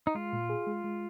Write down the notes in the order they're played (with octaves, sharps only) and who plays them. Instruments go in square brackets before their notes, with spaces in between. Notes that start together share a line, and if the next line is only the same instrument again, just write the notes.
[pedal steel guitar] D#4
[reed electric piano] G#3 [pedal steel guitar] F4
[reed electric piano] A#2
G#4
G#3
G#3